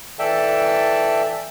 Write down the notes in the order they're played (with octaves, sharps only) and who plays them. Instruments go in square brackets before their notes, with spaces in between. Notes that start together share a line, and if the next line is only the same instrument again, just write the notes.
[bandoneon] E3 A4 D5 E5 G5 A5